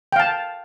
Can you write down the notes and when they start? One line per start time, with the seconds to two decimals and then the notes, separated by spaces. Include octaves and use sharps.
0.12 G5
0.16 F5
0.20 A5